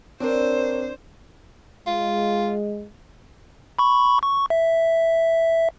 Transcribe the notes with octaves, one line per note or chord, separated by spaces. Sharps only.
C4 D4 A#4 C5 C#5
G#3 F4
B5 C#6
C#6
E5